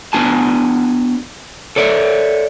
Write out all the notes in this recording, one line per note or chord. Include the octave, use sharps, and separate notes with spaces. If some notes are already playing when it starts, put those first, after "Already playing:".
B3 D4 F#4 G#5 A5
A4 C#5 D5 E5